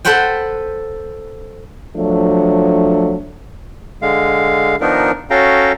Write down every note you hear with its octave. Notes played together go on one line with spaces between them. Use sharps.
A4 B4 C5 F#5 G5
F3 F#3 A3 D4
D3 G#3 F5
D#3 F3 B3 D4 D#4 A#4
C#4 F#4 A4 F5 G5 A#5